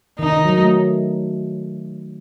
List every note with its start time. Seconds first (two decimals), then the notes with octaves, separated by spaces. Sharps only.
0.19 D#3 D#4
0.32 D#3
0.45 F#3
0.58 A3